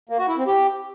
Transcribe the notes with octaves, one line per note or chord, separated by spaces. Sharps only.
A#3
F#4
E4
C4
G4